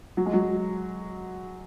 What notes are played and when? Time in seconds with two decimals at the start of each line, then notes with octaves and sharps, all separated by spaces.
0.17 F#3
0.26 G#3
0.33 F#3